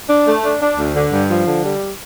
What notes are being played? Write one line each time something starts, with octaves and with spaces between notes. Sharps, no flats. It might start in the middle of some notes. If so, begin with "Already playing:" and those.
D4
A3
D4
D4
D2
D3
G2
F3
D3
G3